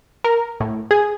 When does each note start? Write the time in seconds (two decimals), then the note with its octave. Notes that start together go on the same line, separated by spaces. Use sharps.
0.24 A#4
0.60 A2
0.91 G#4